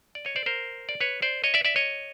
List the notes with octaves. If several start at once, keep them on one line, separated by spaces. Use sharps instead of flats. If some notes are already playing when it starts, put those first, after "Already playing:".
D5
C#5 D#5
C5 D5
A#4 C5
D5
B4 C#5
C5 D5
C#5 D#5
D5 E5
D5 E5
C#5 D#5